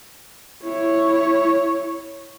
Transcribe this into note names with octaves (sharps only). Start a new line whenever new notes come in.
E4 C#5